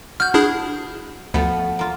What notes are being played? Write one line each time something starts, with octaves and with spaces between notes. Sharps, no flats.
F#4 F6 G6
D4 E4 G#4
D2 F3 A3 B3
A#3 F4